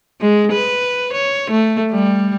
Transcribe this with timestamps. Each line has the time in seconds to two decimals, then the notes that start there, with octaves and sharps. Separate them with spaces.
0.21 G#3
0.52 B4
1.13 C#5
1.51 A3
1.92 G3